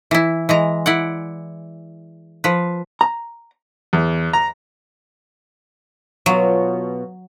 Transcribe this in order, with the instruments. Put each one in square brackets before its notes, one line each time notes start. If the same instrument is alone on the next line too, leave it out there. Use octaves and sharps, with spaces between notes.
[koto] E3 E4
E3 G#3 A#5
E4 D5 F#5
F3 B4
[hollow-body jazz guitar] A#5
[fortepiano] E2
A#5
[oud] B2 B3 F4 [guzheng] F#3